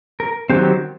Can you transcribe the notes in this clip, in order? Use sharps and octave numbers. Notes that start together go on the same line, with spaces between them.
A#4
D#3 F#3 A3 C4 G4